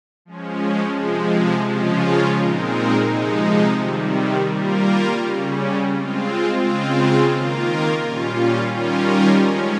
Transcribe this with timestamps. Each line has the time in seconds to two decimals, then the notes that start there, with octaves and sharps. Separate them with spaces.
0.25 F3 G#3 C#4
0.97 C3 F3 G#3
1.67 C#3 F3 G#3 C#4 F4
2.37 A#2 G#3 C4 D#4 A#4
3.09 C3 F3 G#3 D#4
3.79 C3 D#3 G3
4.49 G3 A#3 F4 A#4
5.20 C#3 G3 C#4
5.90 G#3 C4 F4
6.61 C#3 G#3 C4 F4
7.32 D#3 A#3 F4 A#4
8.02 A#2 G3 C#4 F4
8.73 D#3 G3 C#4 F4 A#4
9.44 F3 G#3 C#4